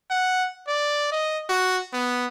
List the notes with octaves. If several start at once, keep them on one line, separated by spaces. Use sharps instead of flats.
F#5
D5
D#5
F#4
B3